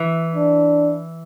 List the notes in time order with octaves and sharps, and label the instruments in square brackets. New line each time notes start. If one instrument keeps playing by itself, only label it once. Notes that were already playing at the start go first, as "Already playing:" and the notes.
Already playing: [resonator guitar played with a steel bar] E3
[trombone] D4